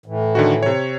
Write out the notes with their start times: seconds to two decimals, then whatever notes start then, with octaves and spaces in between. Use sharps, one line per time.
0.06 A2 E3
0.35 D3 D#3 F#4
0.63 C3 C#5